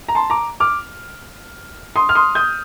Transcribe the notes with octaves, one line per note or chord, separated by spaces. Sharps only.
A#5
A5 C6
A#5 D6
D6 F6
C6 D#6
F6
C6 D#6
D#6 G6